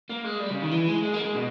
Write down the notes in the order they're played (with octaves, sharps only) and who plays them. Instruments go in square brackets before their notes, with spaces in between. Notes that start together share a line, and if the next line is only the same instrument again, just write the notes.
[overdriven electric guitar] A#3
G#3
G3
C#3
D#3
E3
G#3
G#3
A#3
G#3
B2